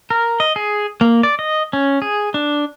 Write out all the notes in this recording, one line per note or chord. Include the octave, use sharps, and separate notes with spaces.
A#4
D#5
G#4
A#3
D5
D#5
C#4
G#4
D4